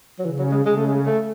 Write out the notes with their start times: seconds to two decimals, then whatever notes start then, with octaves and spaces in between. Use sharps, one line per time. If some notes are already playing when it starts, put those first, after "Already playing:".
0.19 F#3
0.25 C#3 E3
0.38 F#3
0.51 G#3
0.65 C#3 G#3
0.77 A3
0.86 G#3
1.06 A3